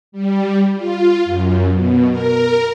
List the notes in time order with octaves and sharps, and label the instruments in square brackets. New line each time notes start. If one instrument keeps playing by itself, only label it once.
[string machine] G3
F4
F#2
B2
A#4